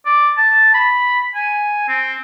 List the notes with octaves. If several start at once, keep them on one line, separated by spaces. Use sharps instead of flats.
D5
A5
B5
G#5
C4